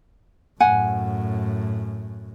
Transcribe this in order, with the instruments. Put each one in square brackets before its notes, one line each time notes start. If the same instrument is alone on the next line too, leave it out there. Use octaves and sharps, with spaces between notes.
[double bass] F#2 A2 [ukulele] F#5 G#5